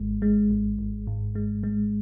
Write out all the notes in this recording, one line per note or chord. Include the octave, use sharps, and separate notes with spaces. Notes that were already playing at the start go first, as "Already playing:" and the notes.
Already playing: G#1 G#3
G#3
G#1
G#1
G#2
G#3
G#3